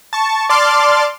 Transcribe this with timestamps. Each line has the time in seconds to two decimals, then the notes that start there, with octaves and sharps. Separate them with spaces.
0.13 A5 C#6
0.50 D5 A5 C6 D6 F6